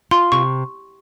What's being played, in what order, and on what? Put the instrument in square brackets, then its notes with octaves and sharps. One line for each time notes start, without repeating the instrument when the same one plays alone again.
[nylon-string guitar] F4 [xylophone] C6
[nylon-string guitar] C3 [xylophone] C#6